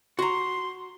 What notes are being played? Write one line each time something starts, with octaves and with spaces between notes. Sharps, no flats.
F#4 A#5 C6